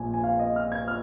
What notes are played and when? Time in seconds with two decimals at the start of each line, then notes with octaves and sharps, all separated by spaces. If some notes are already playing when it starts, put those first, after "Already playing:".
Already playing: A#1 A#2 G#5
0.14 G#5
0.24 F5
0.40 D#5
0.56 F6
0.72 G#6
0.88 F6